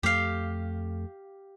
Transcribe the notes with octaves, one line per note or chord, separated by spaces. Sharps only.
F2 A3 G4 F5